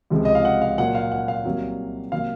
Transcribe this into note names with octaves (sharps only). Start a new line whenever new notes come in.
C#2 C3 F3 G#3
D#5
F5
F#5
F5
A#2 F#3 A#3 F#5
F5
F#5
F5
C2 C3 F#3 A#3
C3 F#3 A#3 F5